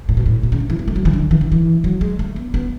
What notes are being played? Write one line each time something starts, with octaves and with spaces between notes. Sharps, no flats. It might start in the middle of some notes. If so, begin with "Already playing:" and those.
A2
B2
A2
B2
C#3
D3
E3
B3
A3
F#3
E3
D3
E3
D3
E3
F#3
G#3
A3
B3
B3